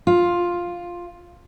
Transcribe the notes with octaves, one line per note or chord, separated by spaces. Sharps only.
F4